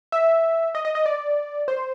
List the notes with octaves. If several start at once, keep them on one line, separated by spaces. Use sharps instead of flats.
E5
D#5
D#5
D#5
D5
C5